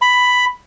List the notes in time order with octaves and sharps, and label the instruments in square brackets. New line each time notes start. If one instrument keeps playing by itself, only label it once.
[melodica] B5